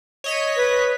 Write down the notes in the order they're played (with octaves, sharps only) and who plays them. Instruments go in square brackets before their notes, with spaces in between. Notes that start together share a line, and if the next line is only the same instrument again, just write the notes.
[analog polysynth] C#5 D#5 B6
[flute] B4